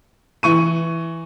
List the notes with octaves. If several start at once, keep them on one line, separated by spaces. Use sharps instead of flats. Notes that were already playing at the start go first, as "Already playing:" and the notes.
E3 C#6 D#7